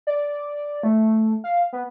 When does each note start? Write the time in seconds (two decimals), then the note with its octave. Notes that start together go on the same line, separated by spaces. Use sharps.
0.07 D5
0.83 A3
1.44 F5
1.73 B3